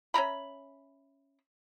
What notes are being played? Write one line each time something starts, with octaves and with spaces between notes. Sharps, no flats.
C#4 E5 A#5 B5